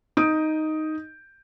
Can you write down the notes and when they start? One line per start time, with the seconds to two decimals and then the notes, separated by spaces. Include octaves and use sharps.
0.17 D#4 D#6 G6 D7